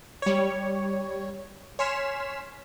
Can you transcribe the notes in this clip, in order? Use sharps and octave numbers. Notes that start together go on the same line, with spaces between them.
G3 C#5
C#5 G#5 C6 F6 B6 E7